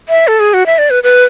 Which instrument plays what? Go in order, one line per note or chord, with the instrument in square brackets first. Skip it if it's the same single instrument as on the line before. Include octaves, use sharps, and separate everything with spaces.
[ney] E5
A4
G#4
F#4
E5
D5
B4
B4